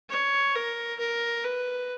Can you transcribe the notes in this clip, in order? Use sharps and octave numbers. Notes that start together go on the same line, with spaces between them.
C#5
A#4
A#4
B4